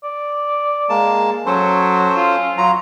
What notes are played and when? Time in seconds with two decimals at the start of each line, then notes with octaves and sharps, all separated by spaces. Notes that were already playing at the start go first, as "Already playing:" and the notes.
0.04 D5
0.89 G#3 A#3 A5
1.46 F#3 C#4 A4 C5
2.16 F4
2.58 F#3 F4 A#5